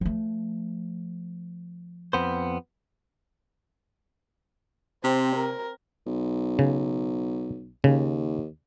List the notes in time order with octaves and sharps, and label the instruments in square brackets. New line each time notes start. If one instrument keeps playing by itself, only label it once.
[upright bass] F3 A3
[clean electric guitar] F2 B3 C5
[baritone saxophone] C3 [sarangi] C4
[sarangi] A#4
[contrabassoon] B1
[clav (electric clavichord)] C#3
[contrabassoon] D#2 [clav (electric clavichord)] C#3